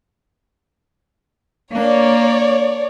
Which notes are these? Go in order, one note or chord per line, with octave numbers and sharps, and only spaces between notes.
A#3 D4 C#5 D5